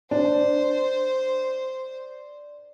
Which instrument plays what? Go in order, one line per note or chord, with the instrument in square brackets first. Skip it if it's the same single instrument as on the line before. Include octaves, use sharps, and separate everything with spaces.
[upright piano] D4 [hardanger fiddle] C5